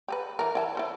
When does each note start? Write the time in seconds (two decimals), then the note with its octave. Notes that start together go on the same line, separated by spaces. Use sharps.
0.08 G4 G#4 B4
0.39 E3 A#4
0.55 E4 G5 A5
0.75 E4 A4 C5